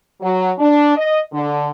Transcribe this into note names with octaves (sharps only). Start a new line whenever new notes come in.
F#3
D4
D#5
D3